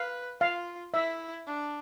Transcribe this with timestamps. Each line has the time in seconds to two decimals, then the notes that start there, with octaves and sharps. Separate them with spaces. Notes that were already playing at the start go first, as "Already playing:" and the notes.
Already playing: B4 F5
0.41 F4 F5
0.94 E4 E5
1.47 D4